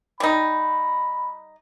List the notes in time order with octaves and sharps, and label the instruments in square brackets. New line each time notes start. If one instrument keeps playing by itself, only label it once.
[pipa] G3 D#4 [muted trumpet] B5